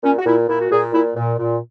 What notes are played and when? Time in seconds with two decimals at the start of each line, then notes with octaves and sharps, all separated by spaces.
0.04 A#2 C#4
0.19 F#4
0.26 A#2 E4
0.49 A#2 E4
0.60 F#4
0.71 A#2 G#4
0.93 A#2 E4
1.16 A#2
1.39 A#2